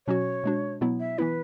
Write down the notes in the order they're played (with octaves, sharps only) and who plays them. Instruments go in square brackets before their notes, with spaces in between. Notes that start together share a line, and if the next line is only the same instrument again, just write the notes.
[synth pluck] B2 F#3 C#4 F#4 [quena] C#5
[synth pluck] B2 G#3 D4 F#4
B2 F#3 B3 E4
[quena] E5
[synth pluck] E3 B3 E4 [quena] B4